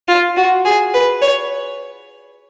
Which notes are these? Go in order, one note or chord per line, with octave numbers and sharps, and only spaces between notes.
F4
F#4
G#4
B4
C#5